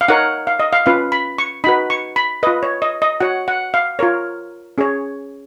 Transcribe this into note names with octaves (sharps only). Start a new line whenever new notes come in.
F5
D#4 A#4 C#5 F#5
F5
D#5
F5
C#4 F4 B4 F5
B5
C#6
D#4 F#4 B4 B5
C#6
B5
F4 B4 D#5
C#5
D#5
D#5
F#4 C#5 F#5
F#5
F5
F4 A#4 C#5
C#4 G#4 C#5